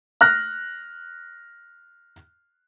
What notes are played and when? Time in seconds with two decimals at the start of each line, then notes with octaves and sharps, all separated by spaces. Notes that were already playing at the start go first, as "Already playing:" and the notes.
0.21 F6 F#6 A#6